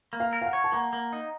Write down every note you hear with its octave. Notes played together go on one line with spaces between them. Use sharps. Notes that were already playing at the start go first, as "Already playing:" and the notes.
A#3
F5
A#4
F5
F#5
C#5
A5
A#3 F#5
A#3
D#4